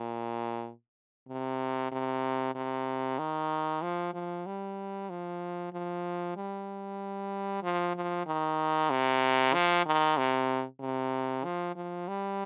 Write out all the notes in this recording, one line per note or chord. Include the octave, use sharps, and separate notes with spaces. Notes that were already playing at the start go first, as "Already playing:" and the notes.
Already playing: A#2
C3
C3
C3
D#3
F3
F3
G3
F3
F3
G3
F3
F3
D#3
C3
F3
D#3
C3
C3
F3
F3
G3